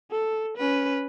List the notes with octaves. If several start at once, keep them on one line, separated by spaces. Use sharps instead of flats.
A4
C#4 B4